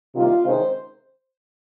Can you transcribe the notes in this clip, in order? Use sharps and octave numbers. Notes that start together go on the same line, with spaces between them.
C3 D#3 G3 A#3 F4
C3 D#3 G#3 C#4 C5